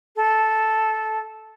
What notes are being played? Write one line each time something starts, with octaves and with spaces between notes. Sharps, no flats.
A4